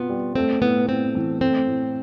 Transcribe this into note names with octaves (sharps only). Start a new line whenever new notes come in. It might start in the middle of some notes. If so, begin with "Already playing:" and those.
Already playing: B2 B3 C4 F4
G3
A3 C4
A2 B3
A2 C4
E3
A3 C4
A2